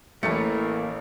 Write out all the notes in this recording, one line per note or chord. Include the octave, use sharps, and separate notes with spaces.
A1 A2 E3 A3 A#3 C#7